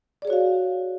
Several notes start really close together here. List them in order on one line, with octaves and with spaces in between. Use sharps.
D5 G#4 C#5 F#4 F5